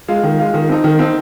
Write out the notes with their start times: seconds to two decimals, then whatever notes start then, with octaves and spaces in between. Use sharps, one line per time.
0.08 G#3 F4
0.23 D#3
0.39 G#3 F4
0.54 D#3
0.69 C4 D#4
0.84 D#3
0.99 C4 D#4